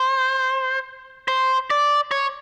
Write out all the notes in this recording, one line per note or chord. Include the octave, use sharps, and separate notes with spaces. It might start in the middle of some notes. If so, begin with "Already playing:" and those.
Already playing: C5
C5
D5
C#5